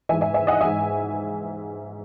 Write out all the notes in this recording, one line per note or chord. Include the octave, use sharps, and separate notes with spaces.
G#2 E3 E5 G#5
E5 G#5
E5 G#5
D#5 F#5
G#2 E3 E5 G#5